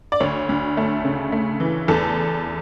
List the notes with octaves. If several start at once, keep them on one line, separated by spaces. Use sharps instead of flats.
D5
D2 C#5
D2
A3
C#3
A3
E3
E2 A4